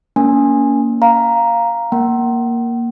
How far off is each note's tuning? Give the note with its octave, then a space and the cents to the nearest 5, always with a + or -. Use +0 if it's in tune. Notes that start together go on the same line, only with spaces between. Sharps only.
A#3 +0 C#4 +30 G#5 -10
F5 +0 A#5 +0
A#3 +0 F#5 +40